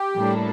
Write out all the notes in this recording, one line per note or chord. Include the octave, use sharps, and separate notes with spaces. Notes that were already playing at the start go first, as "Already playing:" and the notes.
Already playing: G4
A2 G3 A#3 D4 A4